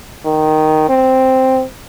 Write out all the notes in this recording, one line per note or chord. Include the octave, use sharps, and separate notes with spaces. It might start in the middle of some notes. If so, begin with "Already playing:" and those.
D#3
C4